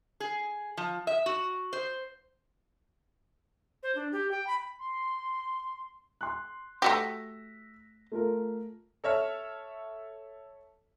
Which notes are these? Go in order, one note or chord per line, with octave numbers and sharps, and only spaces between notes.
G#4
F3
E5
F#4
C5
C5
D4
G4
G5
B5
C6
C6 F#6
A3 F#4 G4 E6 A#6 B6
A3 F4 A#4
A4 C#5 E5 F6